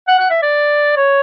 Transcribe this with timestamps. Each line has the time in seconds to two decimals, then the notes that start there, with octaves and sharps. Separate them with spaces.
0.08 F#5
0.19 F#5
0.30 E5
0.42 D5
0.97 C#5